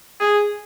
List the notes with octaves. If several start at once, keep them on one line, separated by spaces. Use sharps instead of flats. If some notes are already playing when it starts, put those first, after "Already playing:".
G#4